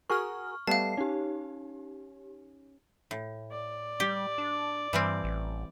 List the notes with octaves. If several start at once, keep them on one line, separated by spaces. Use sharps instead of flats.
F#4 G#4 A#4 C#6 F6
G3 A3 B3 F5 A5 C7
C#4 D#4 G4
A2
D5
G3 G4
D4
G2 E3 G3 C4
A1